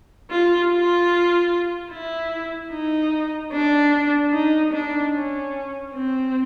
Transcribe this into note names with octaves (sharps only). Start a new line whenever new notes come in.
F4
F4
E4
D#4
D4
D#4
D4
C#4
C4